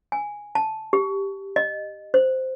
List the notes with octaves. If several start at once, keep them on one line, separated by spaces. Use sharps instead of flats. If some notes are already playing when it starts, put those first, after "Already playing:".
G#5
A5
G4
D#5
C5